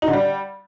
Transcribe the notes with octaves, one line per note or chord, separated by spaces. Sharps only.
D#4
D3
G3